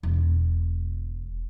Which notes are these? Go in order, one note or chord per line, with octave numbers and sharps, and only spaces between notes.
E1